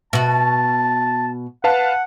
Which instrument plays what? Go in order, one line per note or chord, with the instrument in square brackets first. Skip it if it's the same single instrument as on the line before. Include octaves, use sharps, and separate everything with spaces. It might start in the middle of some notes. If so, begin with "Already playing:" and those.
[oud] B2 F#4 [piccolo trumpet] A5
[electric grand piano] B4 F5 A5 [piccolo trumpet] F#5